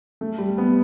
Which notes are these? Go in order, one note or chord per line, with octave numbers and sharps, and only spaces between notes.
A3
G3
B3